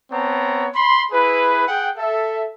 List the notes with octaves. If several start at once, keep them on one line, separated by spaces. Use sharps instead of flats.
B3 C4 C#5 A5 A#5
B5 C6
E4 G#4 B4
G#4 F#5 G5
A4 E5